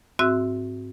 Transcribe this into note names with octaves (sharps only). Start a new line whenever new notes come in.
G#2 C4 F#4 E5 E6 F#6